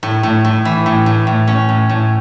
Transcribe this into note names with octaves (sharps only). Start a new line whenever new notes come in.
A2
A2
A2
E3
A2
A2
A2
C#4
A2
A2